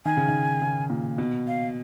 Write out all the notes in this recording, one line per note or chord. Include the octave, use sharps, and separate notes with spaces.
D#3 G#5
C#3
D#3
C#3
A#2
B2
F5